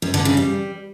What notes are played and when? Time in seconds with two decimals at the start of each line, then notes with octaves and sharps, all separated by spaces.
0.02 F#2
0.14 D3
0.25 C#3
0.37 G3